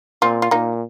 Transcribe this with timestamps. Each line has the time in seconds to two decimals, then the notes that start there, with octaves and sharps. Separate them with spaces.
0.22 A#2 C4 F4
0.42 F4
0.51 A#2 A#3 D#4